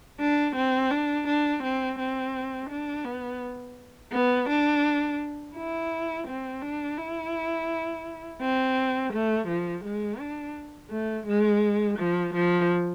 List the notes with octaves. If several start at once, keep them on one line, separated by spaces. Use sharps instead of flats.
D4
C4
D4
D4
C4
C4
D4
B3
B3
D4
E4
C4
D4
E4
C4
A3
F3
G#3
D4
A3
G#3
F3
F3